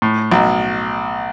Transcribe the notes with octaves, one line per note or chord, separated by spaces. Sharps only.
A2
B1